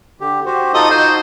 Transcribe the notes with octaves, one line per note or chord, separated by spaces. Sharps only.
D3 G4
F#4 G4 C5
D#4 F4 A4 D#5
D#4 F#4 C5